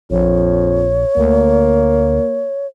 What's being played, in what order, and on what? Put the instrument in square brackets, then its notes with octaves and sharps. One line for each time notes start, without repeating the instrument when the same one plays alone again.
[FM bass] A#1 [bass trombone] F2 [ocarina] C#5
[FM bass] D2 [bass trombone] A#3